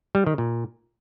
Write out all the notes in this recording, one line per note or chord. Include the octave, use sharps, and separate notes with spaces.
G3
D#3
A#2